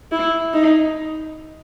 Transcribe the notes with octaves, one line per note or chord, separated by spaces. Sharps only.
E4
D#4